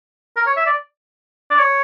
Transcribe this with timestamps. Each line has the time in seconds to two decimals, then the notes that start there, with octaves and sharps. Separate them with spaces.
0.37 A#4
0.47 C#5
0.57 E5
0.66 D5
1.51 D5
1.59 C#5